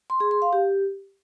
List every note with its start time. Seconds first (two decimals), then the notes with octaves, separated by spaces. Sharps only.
0.10 C6
0.20 G#4
0.31 C6
0.42 F5
0.53 G4